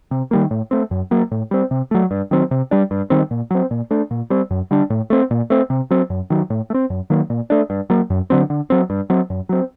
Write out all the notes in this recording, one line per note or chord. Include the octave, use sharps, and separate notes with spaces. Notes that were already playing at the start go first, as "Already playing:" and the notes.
C3
D#3 G3 A#3
A2
A3 C4
F#2
F#3 A#3
A2
G3 C4
C3
F#3 A3
G2
D#3 F#3 C4
C3
G3 D4
G2
D#3 G3 C4
A#2
F#3 C4
A#2
A3 D4
A#2
G3 C4
F#2
D3 G3 D4
A2
A3 C4
A#2
A3 C4
C3
F#3 C4
F#2
D#3 F#3
A2
A3
C4
F#2
D#3 F#3 A#3
A#2
A3 D4
G2
F#3 A#3
F#2
D3 F#3 C4
D3
F#3 C4
G2
F#3 C4
F#2
F#3 C4